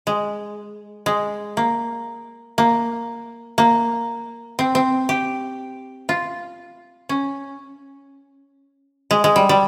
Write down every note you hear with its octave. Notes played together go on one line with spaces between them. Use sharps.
G#3
G#3
A#3
A#3
A#3
C4
C4
G4
F4
C#4
G#3
G#3
G3
G3